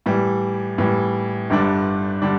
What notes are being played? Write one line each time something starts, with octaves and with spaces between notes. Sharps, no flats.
A2 E3 G3
A2 E3 G3
G1 G2 D3 G3 D4
D3 G3 D4